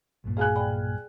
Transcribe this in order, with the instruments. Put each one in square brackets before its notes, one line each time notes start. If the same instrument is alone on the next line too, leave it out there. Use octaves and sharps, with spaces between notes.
[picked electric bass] B1 G2 A#2
[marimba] G#4 [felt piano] F5 G#5 F#6
[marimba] D5 G5 B5